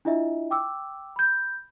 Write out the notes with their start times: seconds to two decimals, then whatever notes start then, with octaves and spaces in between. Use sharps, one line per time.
0.05 D4 E4 F4 D#5 E5
0.51 G5 D6 E6
1.16 B5 G6